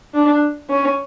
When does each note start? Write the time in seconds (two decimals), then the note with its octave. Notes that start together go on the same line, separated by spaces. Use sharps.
0.14 D4
0.70 C#4